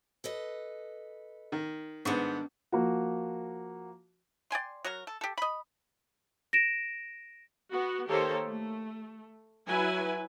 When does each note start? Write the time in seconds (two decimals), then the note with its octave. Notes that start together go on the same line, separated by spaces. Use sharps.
0.24 A4 B4 D#5
1.52 D#3
2.05 G#2 D#3 G3 B3 D4
2.72 F3 A#3 F#4
4.51 D5 G5 G#5 C6
4.85 F#3 F#4 A#4
5.07 A4
5.21 G4 A4
5.38 D#5 B5
6.53 A#6 D7 E7
7.71 B3 F#4
8.09 D#3 A#3 G4 A4 C5 C#5
8.47 A3
9.67 F#3 E4 B4 G#5